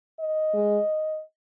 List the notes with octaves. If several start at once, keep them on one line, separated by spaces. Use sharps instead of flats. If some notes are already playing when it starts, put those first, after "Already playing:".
D#5
G#3